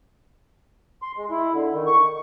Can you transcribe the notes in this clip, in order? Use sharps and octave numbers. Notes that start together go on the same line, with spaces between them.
C6
G#3
E4
D3
D#3
C#6